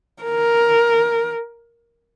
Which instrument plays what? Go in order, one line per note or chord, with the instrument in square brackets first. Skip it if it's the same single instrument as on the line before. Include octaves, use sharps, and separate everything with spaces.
[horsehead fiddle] A#4